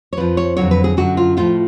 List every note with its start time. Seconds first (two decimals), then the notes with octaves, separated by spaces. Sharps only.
0.13 C#5
0.17 F2 F3 B4
0.37 C#5
0.57 F2 D3 F#3 C#5
0.71 B4
0.84 G#4
0.97 F#2 D3 F#3 F#4
1.17 F4
1.37 A2 F3 F4